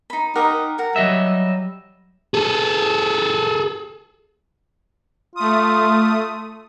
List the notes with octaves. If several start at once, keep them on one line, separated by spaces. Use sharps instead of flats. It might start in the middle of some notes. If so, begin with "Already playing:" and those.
D#4 B5
D#4 G4 A#4 F#5
A#4 F#5
F#3 G3 D#5 E5
G#4 A4
A3 F4 D#6